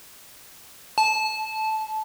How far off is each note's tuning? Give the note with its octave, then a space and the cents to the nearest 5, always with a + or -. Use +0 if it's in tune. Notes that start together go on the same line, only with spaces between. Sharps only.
A5 -20